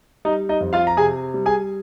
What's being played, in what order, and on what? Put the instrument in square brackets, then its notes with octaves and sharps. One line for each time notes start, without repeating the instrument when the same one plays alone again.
[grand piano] G3 D#4 D#5
D#4 D#5
F2
F4 F5
A#5
C3 G#4 G#5
G3
G#4 G#5